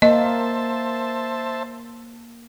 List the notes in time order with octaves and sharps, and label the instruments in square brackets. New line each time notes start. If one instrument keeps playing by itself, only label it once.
[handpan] A#3 [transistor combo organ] C5 E5 A5 [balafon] D#5